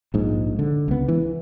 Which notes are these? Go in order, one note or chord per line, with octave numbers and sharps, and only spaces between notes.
A#1 G#2
D3
C#2 B3
E3